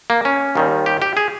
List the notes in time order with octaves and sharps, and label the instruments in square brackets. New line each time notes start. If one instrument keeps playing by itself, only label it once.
[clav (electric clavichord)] A#3
C#4
D#2 D#3 G3
G4
G4
G#4